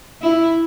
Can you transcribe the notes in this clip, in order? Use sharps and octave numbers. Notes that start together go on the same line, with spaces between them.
E4